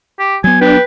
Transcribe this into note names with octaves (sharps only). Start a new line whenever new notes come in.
G4
F#3 B3 G#5
D4 B4 G5